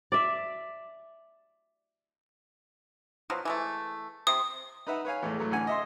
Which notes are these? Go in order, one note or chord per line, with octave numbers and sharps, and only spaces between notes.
D5 E5
B2 F3 F#3
E3 G#3 A3
C3 C6 D#6
D#4 B4 E5 F#5
B4 C#5 F5 G#5
E2 A2 G#3 A3
A2 F#3 A3
A1 D3 F#5 G#5
D#5 E5 C6